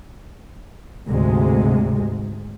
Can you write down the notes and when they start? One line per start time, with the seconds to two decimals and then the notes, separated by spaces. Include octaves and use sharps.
1.08 D2 G#2 C3 G#3